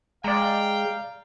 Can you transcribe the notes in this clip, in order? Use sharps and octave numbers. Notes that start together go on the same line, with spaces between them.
G#3 D5 F5 G5 A#5